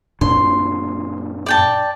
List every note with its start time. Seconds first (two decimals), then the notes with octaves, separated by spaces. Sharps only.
0.21 F#2 A#2 D4 C6
1.46 D5 G5 A5